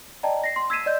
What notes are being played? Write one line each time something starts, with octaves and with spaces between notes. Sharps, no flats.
D5 D#5 G5 A5 A#5
A#6 C7
C6
E6 G#6 B6 C7 D#7 E7
D5 D#5 G6